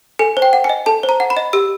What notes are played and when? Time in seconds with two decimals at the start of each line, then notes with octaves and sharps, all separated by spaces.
0.19 A4 G#5
0.37 C5
0.42 G5
0.53 F#5
0.64 G#5
0.69 D#5
0.86 A4 A5
1.03 C5
1.09 A#5
1.20 F#5
1.30 B5
1.37 D#5
1.53 G4 E6